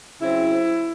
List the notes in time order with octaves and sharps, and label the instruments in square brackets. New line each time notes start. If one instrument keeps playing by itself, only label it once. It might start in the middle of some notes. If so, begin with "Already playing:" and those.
[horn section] C#3 F#3 C4 E4